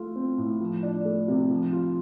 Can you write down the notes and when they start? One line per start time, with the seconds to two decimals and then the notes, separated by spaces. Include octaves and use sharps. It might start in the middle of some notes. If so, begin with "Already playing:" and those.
Already playing: A3 F4
0.16 C4
0.38 A2
0.61 F3
0.83 D4
1.05 A3
1.28 C3
1.51 F3
1.73 F4